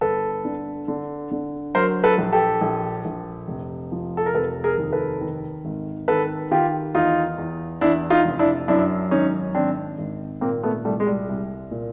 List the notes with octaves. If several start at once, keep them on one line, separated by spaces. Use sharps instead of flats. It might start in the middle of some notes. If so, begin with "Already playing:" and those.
G1 A4 B4
D3
D3
D3
F#3 A#4 C5
A4 B4
A#1
G4 A4
A#1
A#1
F1
F3
A4
A#4
F1 A4 B4
G#4 A#4
D#2
A4 B4
D#3
G#1
D#3 A4 B4
D#3 F4 G4
E2 D#4 F4
E2
E2 D4 E4
D#4 F4
F1
D4 E4
F#2 D4 E4
G#1 C#4 D#4
G#1 C4 D4
G#1
A#2 A#3 C4
A3 B3
C2 G3 A3
G#3
G3
C2
A#2